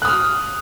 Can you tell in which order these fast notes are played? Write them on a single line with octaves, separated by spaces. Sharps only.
F#6 D#6 F6